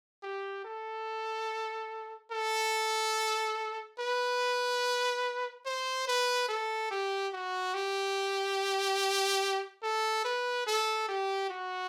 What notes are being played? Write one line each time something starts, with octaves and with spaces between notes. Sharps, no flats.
G4
A4
A4
B4
C5
B4
A4
G4
F#4
G4
A4
B4
A4
G4
F#4